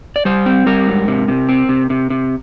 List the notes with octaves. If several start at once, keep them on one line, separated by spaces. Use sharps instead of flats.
D5
G3 C5
C4
G3 A#4
G#2
C3
C3
C4
C3
C3
C3